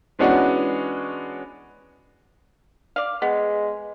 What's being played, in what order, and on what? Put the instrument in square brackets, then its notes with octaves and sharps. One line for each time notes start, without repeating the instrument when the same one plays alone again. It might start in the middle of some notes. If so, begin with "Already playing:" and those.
[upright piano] E3 G#3 B3 C#4 D4 F#4
[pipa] D5 F5
[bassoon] G#3 [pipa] B3